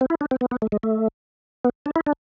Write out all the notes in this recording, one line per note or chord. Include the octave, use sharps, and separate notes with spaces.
C4
E4
D4
C4
B3
B3
A3
G#3
A3
B3
D4
E4
D4